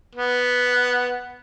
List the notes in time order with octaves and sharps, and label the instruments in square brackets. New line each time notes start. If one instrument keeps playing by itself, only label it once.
[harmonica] B3